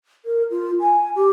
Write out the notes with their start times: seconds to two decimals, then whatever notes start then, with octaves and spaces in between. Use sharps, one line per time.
0.25 A#4
0.50 F4
0.81 G#5
1.16 G4